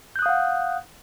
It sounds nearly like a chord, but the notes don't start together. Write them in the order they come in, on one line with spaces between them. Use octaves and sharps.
G6 F#6 D#6 F5 F#5